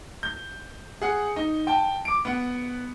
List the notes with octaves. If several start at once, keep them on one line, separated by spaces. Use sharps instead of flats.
G6
G#4 F#5
D#4
G5 A5
D6 D7
B3 F#5